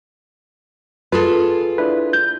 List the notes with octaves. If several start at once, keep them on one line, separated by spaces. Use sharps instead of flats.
F4 G#4 A4 B4
D4 E4 B4
G6